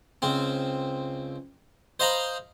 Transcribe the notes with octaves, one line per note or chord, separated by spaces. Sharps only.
C#2 C4
C5 D#5 F5 A#5 B5